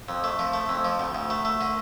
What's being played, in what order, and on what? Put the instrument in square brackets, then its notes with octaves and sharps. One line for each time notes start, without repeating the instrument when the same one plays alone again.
[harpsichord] F2
A3
F3
A3
F2
F3
D2
D2
A3
A3
D3